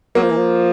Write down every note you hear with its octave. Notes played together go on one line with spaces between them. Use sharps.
F#3 A#3
F3
E3
F3